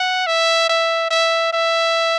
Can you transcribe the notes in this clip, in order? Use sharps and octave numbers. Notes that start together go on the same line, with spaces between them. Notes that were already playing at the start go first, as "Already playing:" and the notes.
Already playing: F#5
E5
E5
E5
E5